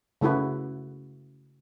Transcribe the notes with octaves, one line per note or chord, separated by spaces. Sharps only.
C#3 A3 E4 F#4 B4